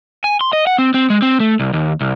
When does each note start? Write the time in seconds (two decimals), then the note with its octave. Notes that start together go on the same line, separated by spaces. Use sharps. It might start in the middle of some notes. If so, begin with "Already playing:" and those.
0.24 G#5
0.41 C6
0.53 D#5
0.67 F#5
0.79 C4
0.94 C4
1.10 G#3
1.22 C4
1.40 A3
1.60 C2
1.73 D#2
2.01 C2